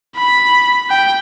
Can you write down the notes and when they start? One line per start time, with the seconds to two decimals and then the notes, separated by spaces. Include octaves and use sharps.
0.16 B5
0.90 G5